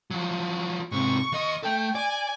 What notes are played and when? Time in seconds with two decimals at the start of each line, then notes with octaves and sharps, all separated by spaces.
0.11 F3 F#3
0.92 G#2 C3 C#6
1.32 D#2 D#5
1.63 A3 A4 G5
1.95 D5 G#5